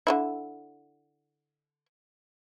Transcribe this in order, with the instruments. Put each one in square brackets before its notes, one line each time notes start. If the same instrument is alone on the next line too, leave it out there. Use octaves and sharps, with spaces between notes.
[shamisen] D3 D#3 E4